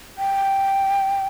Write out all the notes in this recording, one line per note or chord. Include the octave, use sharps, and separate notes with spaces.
G5